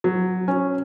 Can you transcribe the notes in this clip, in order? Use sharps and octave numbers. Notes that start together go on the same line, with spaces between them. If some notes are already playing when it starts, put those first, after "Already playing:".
F#3
C#4